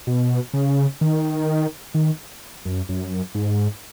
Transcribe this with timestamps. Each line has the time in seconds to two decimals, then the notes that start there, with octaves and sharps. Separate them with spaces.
0.07 B2
0.54 C#3
1.01 D#3
1.94 D#3
2.65 F#2
2.89 F#2
3.35 G#2